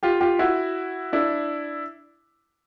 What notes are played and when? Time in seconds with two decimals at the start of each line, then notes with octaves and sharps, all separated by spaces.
0.03 F4 G4
0.21 F4 G4
0.39 E4 F#4
1.13 D4 E4